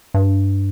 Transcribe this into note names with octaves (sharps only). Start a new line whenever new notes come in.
G2